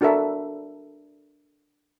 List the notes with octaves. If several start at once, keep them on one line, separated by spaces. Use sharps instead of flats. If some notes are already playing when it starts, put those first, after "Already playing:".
D4 F#4 A4 A#4 E5